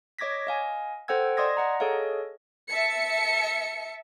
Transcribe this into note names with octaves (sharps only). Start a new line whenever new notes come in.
C#5 D#5 D6 G#6 A#6 B6
D#5 F5 G#5
A4 C5 F#5 G5 E6 G#6
D5 D#5 C6 D#6 G#6 A#6
D#5 F#5 A#5
G#4 A4 C#5 D#5 F5
E5 A5 C#7